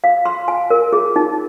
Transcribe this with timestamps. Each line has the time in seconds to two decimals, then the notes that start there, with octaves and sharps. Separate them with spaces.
0.04 F5
0.25 C6
0.48 G#5
0.70 A#4
0.93 G#4
1.16 D#4